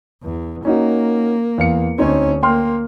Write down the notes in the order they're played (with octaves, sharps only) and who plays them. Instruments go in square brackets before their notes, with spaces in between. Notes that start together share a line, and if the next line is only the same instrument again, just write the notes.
[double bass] E2
[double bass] A#3 [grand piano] C#4 D#4 F#4
[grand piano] E2 F5 C#7
[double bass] D2 C#4 [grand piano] C4 D#4 C#5
[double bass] A#3 [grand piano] G5 C6 F6